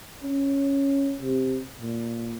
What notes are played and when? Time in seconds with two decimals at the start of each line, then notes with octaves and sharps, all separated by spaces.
0.23 C#4
1.21 C3
1.81 A#2